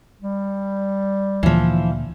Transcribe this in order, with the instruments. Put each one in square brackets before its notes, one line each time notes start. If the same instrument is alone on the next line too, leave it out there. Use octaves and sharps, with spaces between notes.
[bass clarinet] G3
[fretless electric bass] D2 A#2 [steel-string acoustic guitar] E3 F3